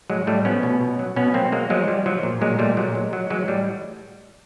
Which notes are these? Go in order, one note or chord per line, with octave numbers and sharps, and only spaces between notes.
A2 F#3 G#3
A2 G3 A3
F3 B3 C#4
B2
B2
F#3
B2 B3 C#4
F#3 A#3 C4
F#3 G#3 A#3
F3 F#3 G#3
F3 G3
F3 F#3
A#2
A#2 F#3 G#3
A#2 G3 A3
A#2 F#3 G#3
F#3
F#3
E3 F#3 G#3
A2 G3